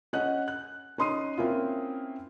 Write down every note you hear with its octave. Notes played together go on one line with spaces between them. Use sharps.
C#4 D#5 F#5 F#6
F#6
C#4 D#4 C6 D#6 C7 D#7
A#3 C4 C#4 E4 F4